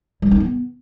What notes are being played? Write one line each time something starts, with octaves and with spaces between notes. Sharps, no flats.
G3
D#4
B3